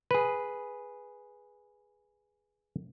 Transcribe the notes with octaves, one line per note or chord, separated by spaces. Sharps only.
G#4 B4